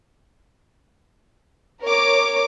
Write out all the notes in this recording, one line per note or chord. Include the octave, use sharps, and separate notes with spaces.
A#4 C#5 D6